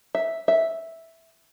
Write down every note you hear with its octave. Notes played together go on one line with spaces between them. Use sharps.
E5
E5